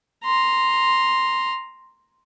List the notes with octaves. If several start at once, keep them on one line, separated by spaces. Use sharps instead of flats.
A#5 C6